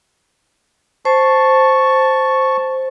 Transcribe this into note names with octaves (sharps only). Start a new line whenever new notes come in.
C5 A5 C#6